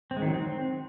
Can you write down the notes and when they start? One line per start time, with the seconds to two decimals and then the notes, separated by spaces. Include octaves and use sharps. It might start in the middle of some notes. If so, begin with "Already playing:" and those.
0.11 C4
0.17 G#3
0.22 D#3
0.28 F#3
0.33 C4